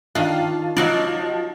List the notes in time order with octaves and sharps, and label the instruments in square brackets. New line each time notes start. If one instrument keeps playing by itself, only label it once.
[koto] D#3 D4 [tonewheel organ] F4 A5 [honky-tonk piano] F5
[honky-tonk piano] F3 D#4 [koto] F#3 F#4 D5